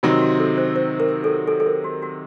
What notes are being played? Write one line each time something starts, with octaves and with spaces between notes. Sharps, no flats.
C3 D#3 F#3 C4 D#4 F#4
F#4
A4
C5
C5
A#4
A4
A4
A4
A#4
F#4
F#4